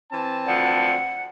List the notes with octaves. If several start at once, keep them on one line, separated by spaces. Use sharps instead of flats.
E3 C4 A5
D2 D3 F3 F#5